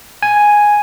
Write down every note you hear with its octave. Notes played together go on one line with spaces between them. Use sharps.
G#5